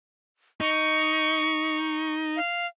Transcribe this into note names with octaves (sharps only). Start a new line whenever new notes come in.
D#4 C#6
F5